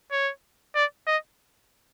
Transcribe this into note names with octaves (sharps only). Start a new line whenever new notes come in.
C#5
D5
D#5